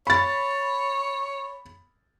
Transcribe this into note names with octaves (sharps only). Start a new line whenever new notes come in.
C#5 B5 A6